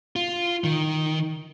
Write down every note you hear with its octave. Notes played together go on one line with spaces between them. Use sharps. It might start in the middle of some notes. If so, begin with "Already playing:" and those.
F4
D#3